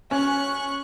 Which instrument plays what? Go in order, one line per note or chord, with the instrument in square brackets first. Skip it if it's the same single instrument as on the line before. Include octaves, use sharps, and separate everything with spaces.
[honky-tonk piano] C#4 [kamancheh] C#6 F#6